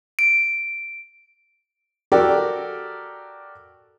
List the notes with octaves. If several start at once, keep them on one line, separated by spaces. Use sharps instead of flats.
D7
F#4 G4 A4 A#4 D5